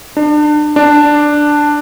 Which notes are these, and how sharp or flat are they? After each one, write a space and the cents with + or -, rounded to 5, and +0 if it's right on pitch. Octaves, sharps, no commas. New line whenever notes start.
D4 +30
D4 +5